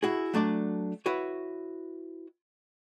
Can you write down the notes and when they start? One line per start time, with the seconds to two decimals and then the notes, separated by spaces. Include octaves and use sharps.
0.03 E4 F#4 G#4
0.34 F#3 A3 D4 D5
1.06 E4 F#4 B4 C#5